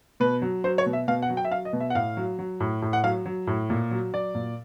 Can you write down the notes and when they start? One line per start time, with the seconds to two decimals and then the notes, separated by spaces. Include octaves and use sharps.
0.20 B2 B4
0.42 F#3
0.64 F#3 C5
0.78 C#5
0.86 B2
0.93 E5
1.08 B2 F5
1.22 F#5
1.30 F#3
1.37 G5
1.45 E5
1.51 F#3 F5
1.65 D#5
1.73 B2
1.80 E5
1.90 F#5
1.95 A2 F5
2.17 F#3
2.39 F#3
2.60 A2
2.82 A2
2.93 F#5
3.03 F#3 F5
3.26 F#3
3.47 A2
3.70 A#2
3.91 F#3
4.13 F#3 D5
4.35 A#2